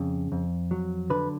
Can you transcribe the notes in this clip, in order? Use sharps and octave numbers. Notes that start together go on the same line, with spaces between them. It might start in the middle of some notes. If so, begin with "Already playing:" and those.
Already playing: F2 C#3
F2
F#3
D3 B4